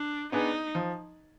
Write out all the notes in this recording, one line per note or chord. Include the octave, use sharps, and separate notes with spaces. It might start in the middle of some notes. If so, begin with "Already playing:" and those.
Already playing: D4
B3 D4 D#4 G#4 B4
F3